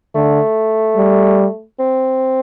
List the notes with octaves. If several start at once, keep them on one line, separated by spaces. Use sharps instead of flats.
D3 A3
G3
C4